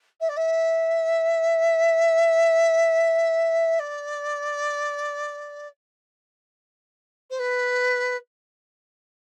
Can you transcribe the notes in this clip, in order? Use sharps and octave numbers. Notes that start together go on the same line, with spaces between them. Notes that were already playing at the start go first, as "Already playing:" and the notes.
E5
D5
E5
D5
C5
B4